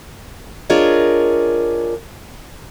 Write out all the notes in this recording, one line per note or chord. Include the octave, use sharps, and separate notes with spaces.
D4 F4 G#4 A#4 C#5 D#5